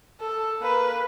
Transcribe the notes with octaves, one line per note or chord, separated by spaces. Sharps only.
A4
A#3 B4